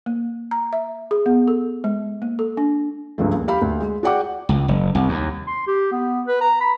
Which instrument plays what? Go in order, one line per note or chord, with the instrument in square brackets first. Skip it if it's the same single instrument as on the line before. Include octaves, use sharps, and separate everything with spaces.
[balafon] A#3
A#5
E5
G#4
B3
A4
G#3
A#3
A4
D4
[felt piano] C#2 G2 F3 A3
D#2
G4 F5 B5
D2
G#3
F#4 G#4 D5 F#5 G5 D6
[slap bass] C#2
F#1
C2
D#2
[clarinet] C6
G4
B3
B4
A#5
B5